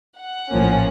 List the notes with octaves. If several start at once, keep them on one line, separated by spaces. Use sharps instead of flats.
F#5
A#1 A2 F3 A#3 C#4